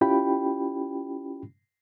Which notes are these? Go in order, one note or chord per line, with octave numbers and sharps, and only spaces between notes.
C#4 E4 F4 G4 G5 B5